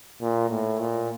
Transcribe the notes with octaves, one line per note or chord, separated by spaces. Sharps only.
A#2
A2
A#2